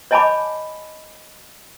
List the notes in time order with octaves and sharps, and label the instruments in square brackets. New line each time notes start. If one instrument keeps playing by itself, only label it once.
[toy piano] C#5 D#5 G#5 A5 B5 D6